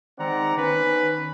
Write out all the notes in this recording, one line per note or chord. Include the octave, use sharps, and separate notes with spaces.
D#3 G#3 C4 D5 F#5 A#5
D#3 B3 C#4 B4